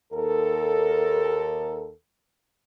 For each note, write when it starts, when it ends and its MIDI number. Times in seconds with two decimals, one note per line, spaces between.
0.13 1.91 39
0.13 1.91 69
0.13 1.91 70